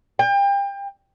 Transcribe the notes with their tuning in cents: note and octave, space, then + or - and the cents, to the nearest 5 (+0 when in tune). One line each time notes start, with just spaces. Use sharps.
G5 +30